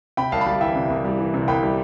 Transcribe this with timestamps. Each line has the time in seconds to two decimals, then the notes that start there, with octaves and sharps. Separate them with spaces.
0.17 C3 G5 B5
0.32 C2 F5 A5
0.41 B5
0.47 G3 F5 A5
0.61 E3 E5 G5
0.75 C3
0.90 C2
1.04 G3
1.19 E3
1.34 C3
1.48 C2 G5 B5
1.63 G3